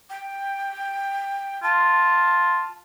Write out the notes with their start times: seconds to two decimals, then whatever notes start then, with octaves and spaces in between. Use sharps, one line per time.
0.10 G5
1.63 F4 A5